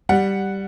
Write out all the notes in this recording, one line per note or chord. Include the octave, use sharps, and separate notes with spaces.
G3 F#5